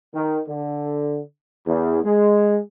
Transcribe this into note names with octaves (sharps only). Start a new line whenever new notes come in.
D#3
D3
E2
G#3